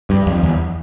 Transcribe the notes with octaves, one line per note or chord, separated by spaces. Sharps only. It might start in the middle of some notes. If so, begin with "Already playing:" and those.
G2
F2
E2